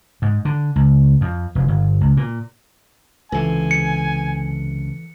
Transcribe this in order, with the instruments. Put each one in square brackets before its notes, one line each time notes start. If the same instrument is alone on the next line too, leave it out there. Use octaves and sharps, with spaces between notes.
[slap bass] G#2
D3
C#2
F2
F1
G1
C#2
A#2
[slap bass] C#2 C3 [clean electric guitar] E3 A4 B4 [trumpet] G#5
[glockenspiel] C#7